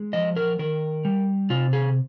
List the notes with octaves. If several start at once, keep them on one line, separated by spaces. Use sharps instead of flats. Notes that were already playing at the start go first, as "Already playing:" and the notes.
Already playing: G#3
F3 D#5
A#4
D#3 A#4
G3
C3 F4
G#4